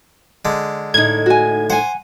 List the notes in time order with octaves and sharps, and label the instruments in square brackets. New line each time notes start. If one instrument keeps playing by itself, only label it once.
[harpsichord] D3 G#3
[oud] A2 D#4 [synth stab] G#6
[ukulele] F#4 G#5
[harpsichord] C5 [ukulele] F#5 G#5